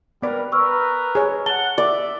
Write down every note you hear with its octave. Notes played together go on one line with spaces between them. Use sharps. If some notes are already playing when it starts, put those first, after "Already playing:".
G3 B3 A#4 B4 D5
A#4 B4 C#6 E6 F6
G#4 C#5
F#5 A5 G7
D5 E5